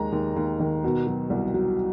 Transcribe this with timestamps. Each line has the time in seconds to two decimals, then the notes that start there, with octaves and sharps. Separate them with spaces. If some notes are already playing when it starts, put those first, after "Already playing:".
Already playing: D#2 D#3 G#3 A#5
0.12 D#2
0.36 D#2
0.60 D#3
0.84 B2
1.07 F#3
1.30 C2
1.54 F#3